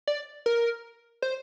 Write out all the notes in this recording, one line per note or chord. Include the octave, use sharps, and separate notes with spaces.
D5
A#4
C5